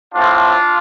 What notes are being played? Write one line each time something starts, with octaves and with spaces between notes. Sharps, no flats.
A2 A3 C4 D4 F4